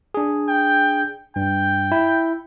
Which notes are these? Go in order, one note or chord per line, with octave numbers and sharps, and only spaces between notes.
D4 G#4
G5
G2 G5
E4